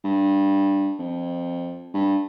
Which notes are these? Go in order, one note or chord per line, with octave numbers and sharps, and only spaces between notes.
G2
F2
G2